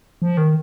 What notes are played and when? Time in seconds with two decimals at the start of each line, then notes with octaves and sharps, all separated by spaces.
0.22 F3
0.37 D#3